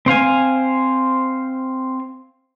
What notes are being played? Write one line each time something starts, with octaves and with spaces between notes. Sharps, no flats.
C4 C5 F5 G#5